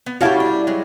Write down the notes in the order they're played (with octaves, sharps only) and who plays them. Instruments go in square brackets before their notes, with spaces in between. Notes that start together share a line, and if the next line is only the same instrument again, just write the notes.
[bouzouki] B3
[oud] G3 E4 F#4 [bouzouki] C#4 F5 A5
[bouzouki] D4
F#3 G#3